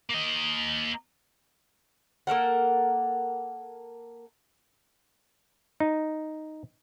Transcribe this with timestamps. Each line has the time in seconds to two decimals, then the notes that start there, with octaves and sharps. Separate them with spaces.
0.10 A#3 D#5
2.27 A#3 A4 A#4 F#5
5.80 D#4